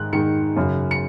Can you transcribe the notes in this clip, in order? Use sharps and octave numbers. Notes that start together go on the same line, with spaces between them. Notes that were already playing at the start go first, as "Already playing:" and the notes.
Already playing: G#2 D#3 F#6
G#2 D#3 C#7
F#2 C#3
C#7